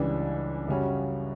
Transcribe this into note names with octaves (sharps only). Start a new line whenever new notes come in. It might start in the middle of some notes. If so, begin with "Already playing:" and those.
Already playing: C#2 C#3 E3 G3 D4
F#2 C#3 G3 C#4 F#4